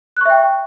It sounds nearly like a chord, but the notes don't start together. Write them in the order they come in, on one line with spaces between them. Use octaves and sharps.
F#6 C#6 E5 G5